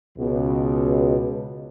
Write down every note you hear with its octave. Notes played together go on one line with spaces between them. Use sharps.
C#2 B2